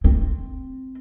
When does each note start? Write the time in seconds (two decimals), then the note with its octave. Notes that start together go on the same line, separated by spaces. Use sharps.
0.04 C4